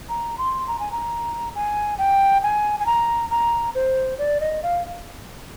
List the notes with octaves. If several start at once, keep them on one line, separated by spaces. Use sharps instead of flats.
A#5
C6
A#5
G#5
A#5
G#5
G5
G#5
G#5
A#5
A#5
C5
D5
D#5
F5